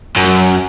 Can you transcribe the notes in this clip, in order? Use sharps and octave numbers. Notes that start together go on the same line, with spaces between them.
F#2